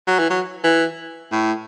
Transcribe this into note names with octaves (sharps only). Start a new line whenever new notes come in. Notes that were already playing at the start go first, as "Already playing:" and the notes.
F#3
E3
F#3
E3
A2